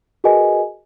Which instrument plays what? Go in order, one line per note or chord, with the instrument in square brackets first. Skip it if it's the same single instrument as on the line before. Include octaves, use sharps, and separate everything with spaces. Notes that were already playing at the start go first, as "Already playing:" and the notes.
[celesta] F#4 G#4 A#4 B4 D#5 G#5